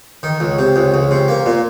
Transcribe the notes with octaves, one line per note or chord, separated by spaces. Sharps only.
D#3
C#2
C3
C#2
C#2
C3
A#3
A#2